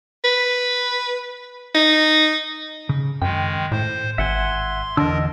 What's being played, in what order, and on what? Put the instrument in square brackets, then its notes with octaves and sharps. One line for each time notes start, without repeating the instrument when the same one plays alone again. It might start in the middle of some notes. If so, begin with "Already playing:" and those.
[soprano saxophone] B4
D#4
[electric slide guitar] C#3
[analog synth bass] F#2 [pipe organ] D#3 G#3 [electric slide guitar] G5
[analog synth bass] A2 [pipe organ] C5
[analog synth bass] G#1 [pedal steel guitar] E5 F#5 G#5 [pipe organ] C6
[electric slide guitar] E2 D3 [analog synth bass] D4 [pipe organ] A#4 [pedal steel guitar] D#5 A5 E6